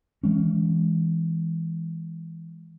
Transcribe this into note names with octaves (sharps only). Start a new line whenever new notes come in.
E3 G#3 C#4